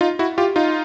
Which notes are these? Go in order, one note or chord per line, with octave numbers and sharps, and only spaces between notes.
D#4 F4
E4 F#4
F4 G4
D#4 F4